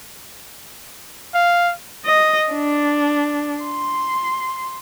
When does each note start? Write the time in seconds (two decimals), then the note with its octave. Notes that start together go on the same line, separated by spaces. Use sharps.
1.34 F5
2.05 D#5
2.52 D4
3.63 C6